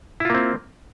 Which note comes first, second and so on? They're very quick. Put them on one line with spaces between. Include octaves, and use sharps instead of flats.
E4 F4 A#3 C4